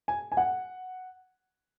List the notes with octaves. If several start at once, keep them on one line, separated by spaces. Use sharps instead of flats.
G#5
G#5
F#5